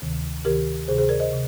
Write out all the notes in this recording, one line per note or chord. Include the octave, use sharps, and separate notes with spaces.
D2 C3 D#3
D2 C3 D#3 G4 A#4
D2 C3 D#3 G#4 C5
G#4 C5
A#4 D5
C5 D#5
C3